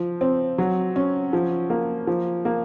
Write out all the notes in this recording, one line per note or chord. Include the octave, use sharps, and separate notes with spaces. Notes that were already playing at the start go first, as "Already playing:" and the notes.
Already playing: F3
C4
F#3
C#4
F3
A#3
F3
A#3